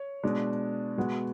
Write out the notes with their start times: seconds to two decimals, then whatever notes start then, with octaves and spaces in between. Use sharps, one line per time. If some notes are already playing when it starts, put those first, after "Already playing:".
Already playing: C#5
0.23 B2 G#3 D4
0.97 B2 G#3 B3 F#4